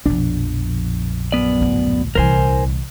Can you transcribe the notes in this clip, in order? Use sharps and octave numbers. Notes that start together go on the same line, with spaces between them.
A#1 F2 B2 D4
F#2 B3 D5
D2 A2
C2 E3 A#4 C5 G#5